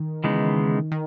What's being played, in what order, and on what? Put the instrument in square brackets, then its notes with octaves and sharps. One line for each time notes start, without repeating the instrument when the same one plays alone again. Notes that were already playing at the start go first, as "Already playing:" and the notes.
Already playing: [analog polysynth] D#3
[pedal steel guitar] C#3 E3 G#3 B3 D#4
[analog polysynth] D#3